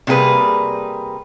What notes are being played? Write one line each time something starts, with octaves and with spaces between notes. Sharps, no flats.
C3 G3 A#3 G#4 B4